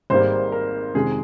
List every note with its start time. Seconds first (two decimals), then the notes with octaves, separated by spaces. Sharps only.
0.10 G#1 G#2 G3 A#3 C5
0.52 A#4
0.94 F2 C3 D#3 G#3 G#4